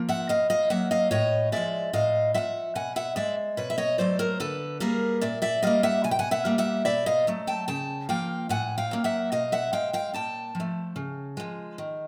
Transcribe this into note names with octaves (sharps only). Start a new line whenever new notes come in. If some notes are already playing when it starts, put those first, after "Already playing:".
Already playing: F3 A#3
E5 F#5
B2 D#5 F5
D#5 F5
F#3 A#3 E5 F#5
D#5 F5
A2 C#5 D#5
F3 G#3 D5 E5
A2 D#5 F5
F3 G#3 E5 F#5
B2 F#5 G#5
E5 F#5
G#3 D5 E5
B2 B4 C#5
E5
C#5 D#5
F#3 A3 C5 D5
A#4 C5
D3 A4 B4
G3 A#3 G#4 A#4
A#2 D5 E5
D5 E5
G3 A#3 D#5 F5
E5 F#5
B2 G#5
G5
F#5 G#5
E5 F#5
G3 A#3
E5 F#5
B2 D5 E5
D#5 F5
F#3 A3
G5 A5
C#3 G5 A5
F3 A#3 F5 G5
A2 F#5 G#5
F5 G5
F#3 A#3
E5 F#5
B2 D#5 F5
E5 F#5
G#3 F5 G5
F5 G5
A#2 G5 A5
F3
A3
C#3
F3 G#3
D#3